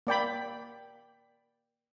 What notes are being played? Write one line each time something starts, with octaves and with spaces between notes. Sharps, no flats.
A#3 D5 G5 B5